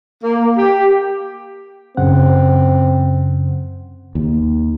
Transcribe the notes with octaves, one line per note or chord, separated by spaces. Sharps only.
A#3
G4
F#2 C#3 C4 F#5
D#2